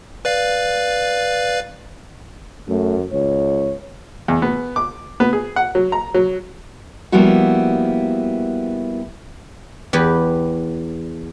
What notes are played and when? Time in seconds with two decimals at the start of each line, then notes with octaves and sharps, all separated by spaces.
0.25 B4 D5 F5
2.68 F#2 A3
3.13 C#2 C#5
4.28 E2
4.42 B3
4.76 D6
5.20 B3
5.33 G#4
5.56 F#5
5.75 F#3
5.92 A#5
6.14 F#3
7.12 F3 G3 A#3 B3 E4 F#4
9.93 E2 G4 B4